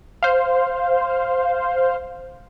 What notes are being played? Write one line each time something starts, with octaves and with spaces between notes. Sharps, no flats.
C5 F5